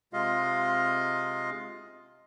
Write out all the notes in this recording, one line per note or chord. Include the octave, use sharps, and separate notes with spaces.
C3 G#3 F4 D#5 F5